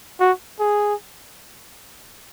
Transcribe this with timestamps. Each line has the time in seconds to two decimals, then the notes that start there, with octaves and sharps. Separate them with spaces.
0.20 F#4
0.59 G#4